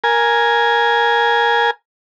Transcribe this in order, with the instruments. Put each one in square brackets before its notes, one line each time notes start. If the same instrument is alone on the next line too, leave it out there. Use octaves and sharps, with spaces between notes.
[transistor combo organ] A#4 G#5